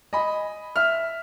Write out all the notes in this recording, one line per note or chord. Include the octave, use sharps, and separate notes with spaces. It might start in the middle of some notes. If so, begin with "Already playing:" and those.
D#5 G#5 B5
E5 F6